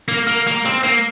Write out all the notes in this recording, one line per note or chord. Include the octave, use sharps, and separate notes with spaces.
A#3
A#3
A#3
C4
A#3